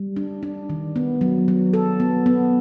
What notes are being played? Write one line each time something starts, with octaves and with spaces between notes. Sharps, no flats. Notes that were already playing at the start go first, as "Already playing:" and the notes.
Already playing: G3
D4
D4
D#3
B3
F#3
F#3
A4
B3
B3